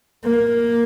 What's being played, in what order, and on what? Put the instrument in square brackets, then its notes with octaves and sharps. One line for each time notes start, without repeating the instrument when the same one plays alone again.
[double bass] A#3